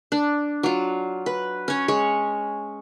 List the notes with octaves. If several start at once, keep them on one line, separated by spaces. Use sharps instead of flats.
D4
F#3 F4
B4
C#4 C#5
G#3 C#5